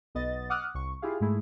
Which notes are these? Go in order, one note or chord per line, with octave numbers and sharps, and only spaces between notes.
B1 B3 D#5 A6
F#5 D6 D#6 F6 F#6
C2 C#6
E4 F4 G4 G#4 F5
G#2 G#3 A3 E4 G#4